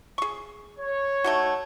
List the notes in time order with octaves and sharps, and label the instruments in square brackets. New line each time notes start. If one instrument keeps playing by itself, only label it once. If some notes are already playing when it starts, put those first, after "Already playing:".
[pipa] G#4 C#6
[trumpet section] C#5
[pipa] A3 D#4 F#4